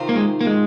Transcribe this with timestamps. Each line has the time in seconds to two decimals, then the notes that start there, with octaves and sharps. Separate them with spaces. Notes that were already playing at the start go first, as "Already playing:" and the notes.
Already playing: C3 D#3 C4 F4
0.09 A#3
0.16 G#3
0.41 A#3
0.47 G#3